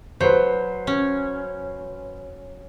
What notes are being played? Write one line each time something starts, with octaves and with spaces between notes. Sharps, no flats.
F#3 B4 C5
C#4